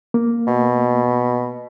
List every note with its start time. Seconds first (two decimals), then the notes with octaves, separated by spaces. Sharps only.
0.14 A#3
0.47 B2